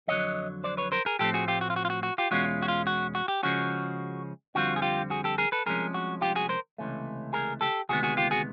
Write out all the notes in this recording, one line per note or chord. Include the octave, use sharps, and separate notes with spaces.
F2 D3 F#3 C#5 D#5
C5 D5
B4 C#5
A#4 C5
G#4 A#4
A2 F3 A3 C4 G4 A4
F#4 G#4
F4 G4
F#4
F4
F#4
F4
F#4
F#4
F4 G4
E2 B2 G#3 C#4 F4 F#4
F#4
F4
F#4
F#4
G4
C#3 F3 G#3 C#4 F#4
F2 D3 G3 C4 F4 F#4
G#4
F4 G4
F#4 G#4
G4 A4
G#4 A#4
A4 B4
C2 C3 F3 G#3 C#4 G#4 A#4
F#4
F4 G4
F#4 G#4
A#4 C5
C#2 C3 E3 A3 C#4
G#4 A#4
G4 A4
D2 C3 D#3 G#3 B3 F#4 G#4
F#4 G#4
F4 G4
F#4 G#4